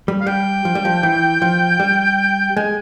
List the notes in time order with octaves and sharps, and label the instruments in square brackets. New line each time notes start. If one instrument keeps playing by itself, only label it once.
[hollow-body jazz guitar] G3
[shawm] F5
[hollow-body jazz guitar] G3 [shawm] G5
[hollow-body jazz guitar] F3
G3
F3
E3
F3
G3
[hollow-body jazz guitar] G#3 [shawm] G#5